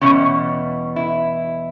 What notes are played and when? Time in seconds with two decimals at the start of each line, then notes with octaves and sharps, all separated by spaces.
0.01 E2 B2 G3 C#4
0.96 E4